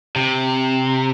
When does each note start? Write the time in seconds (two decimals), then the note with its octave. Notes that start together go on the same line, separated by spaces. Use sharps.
0.16 C3